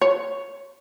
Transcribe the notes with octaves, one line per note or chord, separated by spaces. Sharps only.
C#5